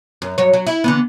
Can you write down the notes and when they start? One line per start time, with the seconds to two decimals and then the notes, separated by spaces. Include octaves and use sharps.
0.22 F#2
0.38 G2 F#3 C#5
0.53 F#3
0.67 E4
0.84 D3 E3 B3